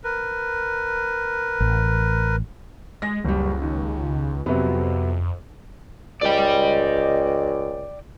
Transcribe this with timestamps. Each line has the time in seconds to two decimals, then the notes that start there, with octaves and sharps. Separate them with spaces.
0.04 A#4 B4
1.60 A1
3.02 G#3 A#6
3.25 F#1 C#2 G3
3.62 D#2
4.46 F2 C3 F#3 B3
6.22 C#2 D5 D#5 G5